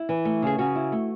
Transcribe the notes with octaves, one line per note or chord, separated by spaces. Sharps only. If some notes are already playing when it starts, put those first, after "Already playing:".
Already playing: E4
E3
A3
C#3 G#4
C#3 F#4
E4
A3